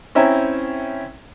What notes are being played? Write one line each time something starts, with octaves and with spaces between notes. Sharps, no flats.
C4 C#4 E4 E5 G5 A#5